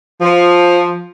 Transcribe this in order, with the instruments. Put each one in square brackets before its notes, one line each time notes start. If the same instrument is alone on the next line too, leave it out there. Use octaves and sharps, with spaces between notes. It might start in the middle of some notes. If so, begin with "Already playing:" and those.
[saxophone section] F3